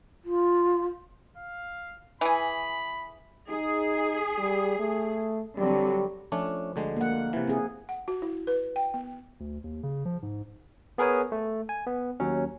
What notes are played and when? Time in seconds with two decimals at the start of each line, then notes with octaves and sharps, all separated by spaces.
0.24 F4
1.37 F5
2.21 E3 G#4 B5
3.49 D#4 G#4
4.38 G3
4.80 A3
5.58 D3 F#3 G3 C4
6.32 F3 A3 C#4 D4
6.76 D2 D3 G#3
6.97 A#3 F#5
7.33 C3 E3
7.47 C4 G#4
7.89 F#5
8.08 F#4
8.22 E4
8.47 B4
8.76 G5
8.94 B3
9.40 D2
9.64 D#2
9.83 C#3
10.05 F3
10.22 G#2
10.98 B3 G#4 A#4 B4 C#5 G#5
11.32 A3
11.69 G#5
11.86 B3
12.20 D#2 F#3 C#4